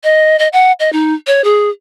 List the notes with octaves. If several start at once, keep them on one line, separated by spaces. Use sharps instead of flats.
D#5
D#5
F#5
D#5
D#4
C#5
G#4